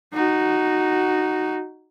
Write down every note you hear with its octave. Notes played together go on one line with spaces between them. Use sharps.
D#4 F#4